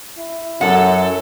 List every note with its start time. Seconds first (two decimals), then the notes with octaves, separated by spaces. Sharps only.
0.18 E4
0.61 F#2 A4 F#5